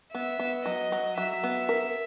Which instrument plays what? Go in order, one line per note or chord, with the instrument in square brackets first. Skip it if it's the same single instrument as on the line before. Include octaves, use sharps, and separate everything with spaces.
[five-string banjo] B3 [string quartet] E5
[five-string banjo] B3
[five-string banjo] F#3 [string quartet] D#5
[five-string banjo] F#3
[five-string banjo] F#3 [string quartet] E5
[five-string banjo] B3
A#4